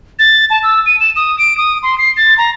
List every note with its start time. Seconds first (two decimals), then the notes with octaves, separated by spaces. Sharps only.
0.19 A6
0.50 A5
0.63 E6
0.86 D#7
1.00 E7
1.16 D#6
1.39 D7
1.58 D#6
1.83 C6
1.98 C7
2.17 A6
2.38 A#5